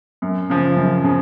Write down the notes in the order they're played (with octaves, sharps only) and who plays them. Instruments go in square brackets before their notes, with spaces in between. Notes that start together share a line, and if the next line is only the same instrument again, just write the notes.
[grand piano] F#2
C#3 F3
F#2
C#3 F3